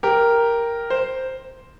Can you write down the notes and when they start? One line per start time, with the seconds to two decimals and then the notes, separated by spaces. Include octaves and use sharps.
0.03 G4 A#4
0.90 C5